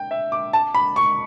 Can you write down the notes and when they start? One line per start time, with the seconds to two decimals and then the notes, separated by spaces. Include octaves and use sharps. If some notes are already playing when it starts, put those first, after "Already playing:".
Already playing: G5
0.11 E5
0.32 D6
0.53 A5
0.75 B5
0.96 C#6